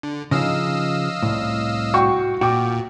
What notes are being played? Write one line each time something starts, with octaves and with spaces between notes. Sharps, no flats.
D3
C#3 F3 D#4 D#5 F5 E6
C2 A2
F#4 G5 C#6
A#2 F#4 G5 D6